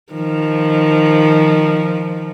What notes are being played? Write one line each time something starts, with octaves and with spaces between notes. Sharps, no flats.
D#3 F3